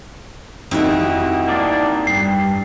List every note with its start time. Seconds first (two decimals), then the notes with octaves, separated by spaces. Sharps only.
0.71 F2 D#3 G3 E4 F#4 D#5
1.47 A#3 D4 D5
2.07 G2 C7